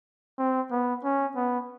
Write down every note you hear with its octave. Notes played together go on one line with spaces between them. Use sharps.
C4
B3
C#4
B3